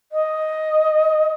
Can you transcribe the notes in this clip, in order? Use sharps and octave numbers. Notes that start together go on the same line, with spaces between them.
D#5